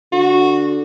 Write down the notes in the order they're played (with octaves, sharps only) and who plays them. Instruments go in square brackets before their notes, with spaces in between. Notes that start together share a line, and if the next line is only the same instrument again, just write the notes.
[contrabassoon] D3 [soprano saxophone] F#4